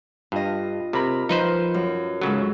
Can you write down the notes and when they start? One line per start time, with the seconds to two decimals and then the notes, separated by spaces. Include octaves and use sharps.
0.32 G2 F4 D#5
0.93 C3 A#4 B5
1.29 F3 D#4 B4 C5
1.74 F#2
2.21 G#2 C#3 F#3 A4